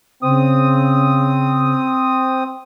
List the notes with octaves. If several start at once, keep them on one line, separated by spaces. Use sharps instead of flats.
C#3 C4 D#6